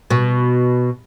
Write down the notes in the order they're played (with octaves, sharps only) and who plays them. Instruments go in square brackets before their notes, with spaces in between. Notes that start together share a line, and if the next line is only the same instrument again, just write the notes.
[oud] B2